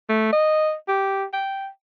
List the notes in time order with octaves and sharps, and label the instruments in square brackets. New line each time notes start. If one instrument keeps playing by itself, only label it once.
[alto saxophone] A3
D#5
G4
G5